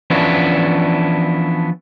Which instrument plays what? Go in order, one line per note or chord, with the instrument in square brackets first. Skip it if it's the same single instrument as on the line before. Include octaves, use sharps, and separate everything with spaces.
[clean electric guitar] E3 F3 B3 C#4 D4 E4